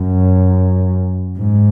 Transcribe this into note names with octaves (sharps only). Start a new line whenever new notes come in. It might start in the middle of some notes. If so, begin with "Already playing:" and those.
Already playing: F#2
G#2